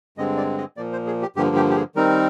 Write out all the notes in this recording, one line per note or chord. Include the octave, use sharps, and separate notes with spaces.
G2 D3 G#3 C4 D#5
D5
D#5
A#2 F3 A#3 D5
C5
G#4
G4
G2 D3 F3 A#3 G4
G4
G4
G#4
D#3 G3 C4 D#4 A#4